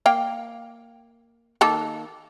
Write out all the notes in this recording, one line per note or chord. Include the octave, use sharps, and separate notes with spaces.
A#3 F5 G5
D#3 A#3 A4